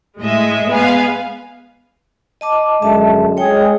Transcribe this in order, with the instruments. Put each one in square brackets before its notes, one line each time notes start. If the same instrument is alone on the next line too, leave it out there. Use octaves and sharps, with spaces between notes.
[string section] A2 G#3 D#5 E5
G#3 B3 G#4 B4 F5
[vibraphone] D#5 A5 D6
[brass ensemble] F#2 D3 G#3 [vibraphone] E5 A5
[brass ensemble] G#3 [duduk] G#4 [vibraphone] C#5 G5